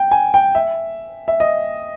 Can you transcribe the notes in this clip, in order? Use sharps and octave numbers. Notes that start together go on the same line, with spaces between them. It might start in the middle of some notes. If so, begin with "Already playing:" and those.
Already playing: G5
G#5
G5
E5
E5
D#5